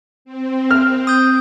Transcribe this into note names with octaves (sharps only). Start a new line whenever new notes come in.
C4
F6
D#6 G6